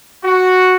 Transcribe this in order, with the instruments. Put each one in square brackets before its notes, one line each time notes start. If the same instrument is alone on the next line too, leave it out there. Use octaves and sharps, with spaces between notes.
[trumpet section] F#4